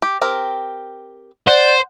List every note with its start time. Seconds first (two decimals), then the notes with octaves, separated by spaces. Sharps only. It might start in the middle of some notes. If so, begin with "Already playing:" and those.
0.02 G4
0.21 C4 G4 A#4
1.47 C5 D5 F#5